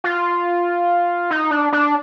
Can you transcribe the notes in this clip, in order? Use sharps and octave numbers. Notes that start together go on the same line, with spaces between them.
F4
D#4
D4
D4